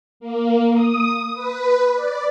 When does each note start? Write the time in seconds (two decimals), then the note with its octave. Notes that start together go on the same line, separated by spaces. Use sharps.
0.20 A#3
0.74 D#6
1.34 B4
1.95 D5